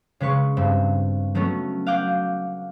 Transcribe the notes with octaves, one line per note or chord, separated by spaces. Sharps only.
C#3 G#3 B4 C#6
G2 C4
F#3 A3 B3 C#4
F5 F#5 D6 G6